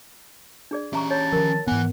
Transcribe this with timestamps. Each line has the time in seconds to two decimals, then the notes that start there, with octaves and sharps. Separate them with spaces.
0.71 D4 G#4 D5
0.93 C#4 G4 E5 A#5 C#6
1.11 C#5 A5
1.32 D#3 F3 A#4
1.67 G#2 E3 B3 F#5 G#5